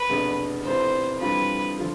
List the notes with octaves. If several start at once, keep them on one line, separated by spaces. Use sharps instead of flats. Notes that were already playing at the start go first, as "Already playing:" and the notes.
Already playing: B4
F1 E2 B2 B3 D4
F1 F2 C3 E3 B3 C5
F2 E3 G3 D4 F4 B4
D3 F3